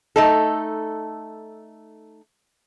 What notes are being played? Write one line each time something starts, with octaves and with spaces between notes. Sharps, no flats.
A3 D#4 A4